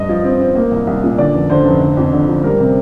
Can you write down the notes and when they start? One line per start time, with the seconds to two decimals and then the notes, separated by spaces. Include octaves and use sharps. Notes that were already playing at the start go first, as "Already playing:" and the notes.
Already playing: G2 D#5
0.09 F3
0.24 C4
0.41 C4
0.55 A#3
0.71 C2
0.87 C2
1.04 A#2
1.18 D3 D5
1.34 F1
1.50 D3 C5
1.66 F1
1.82 D3
1.97 F2
2.13 D3
2.28 F3
2.44 G3 A#4
2.60 C3